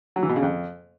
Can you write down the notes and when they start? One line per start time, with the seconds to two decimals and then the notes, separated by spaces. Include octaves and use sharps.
0.16 F#3
0.23 E3
0.29 B2
0.36 C#3
0.43 F2